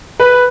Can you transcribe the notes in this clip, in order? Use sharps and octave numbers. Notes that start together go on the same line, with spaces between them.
B4